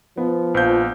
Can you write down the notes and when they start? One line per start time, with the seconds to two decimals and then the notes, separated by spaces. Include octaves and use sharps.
0.17 F3 B3
0.54 A#1 F4 C5 F5 G6